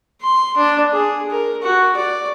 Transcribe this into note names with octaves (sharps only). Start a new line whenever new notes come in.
C6
D4
G#4
A#4
F#4
D5